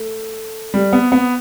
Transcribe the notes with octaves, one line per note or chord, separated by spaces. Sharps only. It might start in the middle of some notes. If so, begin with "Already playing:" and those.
Already playing: A3
G3
B3
B3